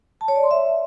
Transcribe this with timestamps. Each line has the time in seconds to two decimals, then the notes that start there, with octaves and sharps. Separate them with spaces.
0.21 A5
0.28 C#5
0.36 D5
0.43 C6
0.51 E5